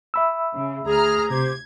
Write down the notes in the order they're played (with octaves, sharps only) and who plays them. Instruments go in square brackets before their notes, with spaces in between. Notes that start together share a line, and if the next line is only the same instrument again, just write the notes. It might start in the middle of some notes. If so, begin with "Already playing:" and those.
[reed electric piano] E5 B5 E6
[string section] C#3
[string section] D2 A#5 F6 [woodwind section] G#4
[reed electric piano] C3 [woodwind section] G4 C5 [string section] G#6